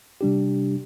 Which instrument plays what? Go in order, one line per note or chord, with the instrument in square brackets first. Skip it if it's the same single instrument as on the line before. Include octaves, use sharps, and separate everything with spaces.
[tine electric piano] C3 G3 D4 G4